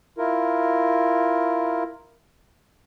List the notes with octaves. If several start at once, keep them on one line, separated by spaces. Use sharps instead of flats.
E4 F4 A#4